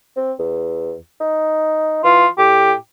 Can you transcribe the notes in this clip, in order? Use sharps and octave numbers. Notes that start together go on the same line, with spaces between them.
C4
E2
D#4
E3 F4
A2 G4